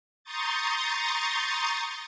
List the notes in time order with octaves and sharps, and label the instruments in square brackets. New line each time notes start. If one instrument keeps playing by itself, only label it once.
[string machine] A#5 C6 C#6 D#6 G6 A6